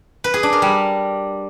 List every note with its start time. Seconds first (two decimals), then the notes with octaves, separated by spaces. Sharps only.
0.24 B4
0.34 G#4
0.43 D4
0.53 A#4
0.62 G3